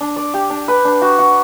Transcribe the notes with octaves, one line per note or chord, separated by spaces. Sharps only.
D4
D5
G4
D4
B4
D4
F#4
F#4